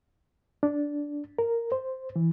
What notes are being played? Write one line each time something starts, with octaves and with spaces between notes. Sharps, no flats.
D4
A#4
C5
E3